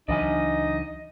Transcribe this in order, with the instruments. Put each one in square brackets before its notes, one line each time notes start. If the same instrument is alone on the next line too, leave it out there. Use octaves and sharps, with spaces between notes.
[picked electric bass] C#2 E3 F#3 [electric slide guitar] D4 G#5 [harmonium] D#4 [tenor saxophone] D#5